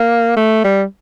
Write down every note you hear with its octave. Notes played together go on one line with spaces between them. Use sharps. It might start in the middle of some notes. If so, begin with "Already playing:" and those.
Already playing: A#3
A3
G3